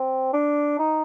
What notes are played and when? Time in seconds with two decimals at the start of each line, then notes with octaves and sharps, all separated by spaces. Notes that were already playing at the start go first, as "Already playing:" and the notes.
Already playing: C4
0.33 D4
0.79 D#4